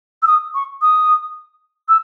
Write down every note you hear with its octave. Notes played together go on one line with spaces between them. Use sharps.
E6
D#6
C#6
D#6
E6